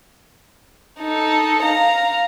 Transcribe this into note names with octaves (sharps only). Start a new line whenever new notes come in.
D#4 A4
F5 A#5